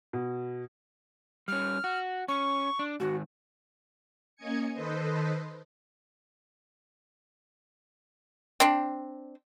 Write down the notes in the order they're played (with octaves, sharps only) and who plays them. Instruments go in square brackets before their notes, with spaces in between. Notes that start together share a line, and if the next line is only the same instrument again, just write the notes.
[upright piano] B2
[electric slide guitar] G3 C#4 [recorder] F6
[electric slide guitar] F#4
[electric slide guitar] C#4 [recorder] C#6
[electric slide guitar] D4
[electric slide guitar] G#2 D#3 [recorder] F#4
[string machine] A#3 C#4 D#5 G#5 G#6 C#7
D#3 A4 B4 C5 D#5
[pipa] C4 D4